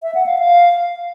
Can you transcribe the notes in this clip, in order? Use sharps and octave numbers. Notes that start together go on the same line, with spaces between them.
E5
F#5
F5
F5